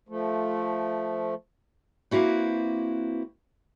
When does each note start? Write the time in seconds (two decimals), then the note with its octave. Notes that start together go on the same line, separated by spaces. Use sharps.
0.09 F3 A3
2.11 A#3 C4 E4 F#4 B4